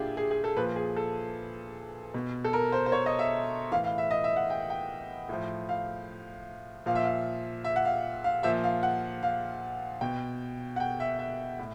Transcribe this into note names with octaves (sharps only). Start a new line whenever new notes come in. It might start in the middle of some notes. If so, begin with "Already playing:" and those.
Already playing: A#2 D4 E4 F4 G4 G#4
G#4
G#4
A4
A#2 F3 B4
G#4
A4
B2
A4
A#4
C5
C5
C#5
D#5
E5
A2 E3 F5
F5
E5
D#5
E5
F#5
G5
G5
A2 F3
F5
A#2 F3 F5
E5
F5
E5
F#5
F5
F5
A#2 F3 E5
F5
F#5
F5
B2 G5
F#5
G5
E5
E5
A2